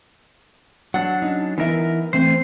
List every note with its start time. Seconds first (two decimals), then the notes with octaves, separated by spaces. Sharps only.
0.94 F#3 D4 F#5
1.22 C#4 D#4
1.58 E3 B3 D#4 A#4 E5
2.13 E3 A3 C4 C5